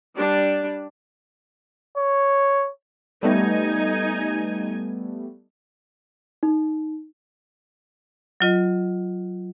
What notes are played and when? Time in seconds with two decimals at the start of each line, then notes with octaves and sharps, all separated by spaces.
0.15 G3 D4 D5
1.97 C#5
3.23 G3 A3 B3 D#4 G#5
6.43 D#4
8.40 F#3 F4 D#5